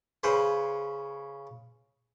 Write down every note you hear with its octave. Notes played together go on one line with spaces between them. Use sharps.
C#3 B4 C5